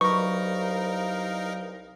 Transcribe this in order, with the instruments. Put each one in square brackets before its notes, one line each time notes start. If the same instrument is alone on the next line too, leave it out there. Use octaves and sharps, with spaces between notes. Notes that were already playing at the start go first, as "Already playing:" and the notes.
[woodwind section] C2 F5 [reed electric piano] F#3 B4 B5 [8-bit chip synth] D#4 A#4 [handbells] C#6